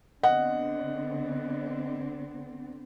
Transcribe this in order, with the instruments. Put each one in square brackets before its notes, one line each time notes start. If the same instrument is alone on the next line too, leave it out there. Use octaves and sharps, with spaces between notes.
[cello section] D3 B3 C4 [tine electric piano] D#5 [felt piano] F#5